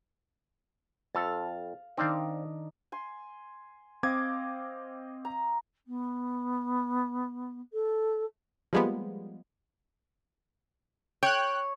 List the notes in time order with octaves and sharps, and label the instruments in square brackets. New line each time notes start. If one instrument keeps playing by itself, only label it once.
[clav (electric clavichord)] F2 A4 [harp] F5 F6 A6
[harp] D#3 D4 D#4 [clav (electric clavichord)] C4 D5 F5
[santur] G#5 C6
[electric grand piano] C4 D6 G#6 [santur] D#5 F5
[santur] A#5
[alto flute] B3
A4
[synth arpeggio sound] F3 G3 G#3 A#3 B3
[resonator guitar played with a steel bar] C#5 [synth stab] G5 F#6